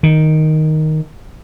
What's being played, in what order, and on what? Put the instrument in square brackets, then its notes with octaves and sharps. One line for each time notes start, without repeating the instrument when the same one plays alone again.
[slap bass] D#3